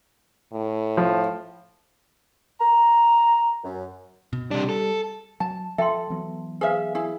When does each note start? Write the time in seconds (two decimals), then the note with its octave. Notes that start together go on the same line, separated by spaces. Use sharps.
0.52 A2
0.97 F3
2.59 A#5
3.63 F#2
4.33 B2
4.51 C3 G3 D4
4.69 A4
5.40 F#3 A5
5.78 F3 A4 E5 G5 C6
6.10 E3 F#3 B3
6.61 G#4 B4 C5 E5 F5
6.95 E4 G#4